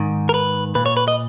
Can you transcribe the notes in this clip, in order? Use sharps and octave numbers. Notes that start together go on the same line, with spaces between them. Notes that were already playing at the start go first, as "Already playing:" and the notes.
Already playing: G#2 D#3
A#4
B4
A#2 B4
C#5
B4
D#5